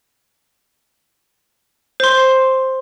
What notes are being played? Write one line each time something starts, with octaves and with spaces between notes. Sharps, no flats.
C5 C6